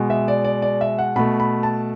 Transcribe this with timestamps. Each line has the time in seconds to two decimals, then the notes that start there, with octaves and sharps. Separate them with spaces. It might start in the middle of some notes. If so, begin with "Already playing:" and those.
Already playing: B2 G#3
0.10 E5
0.28 D5
0.44 D5
0.62 D5
0.81 E5
0.99 F#5
1.16 B2 A3 B5
1.40 B5
1.63 A5